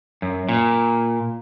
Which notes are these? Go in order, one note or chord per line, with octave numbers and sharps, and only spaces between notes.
F#2
A#2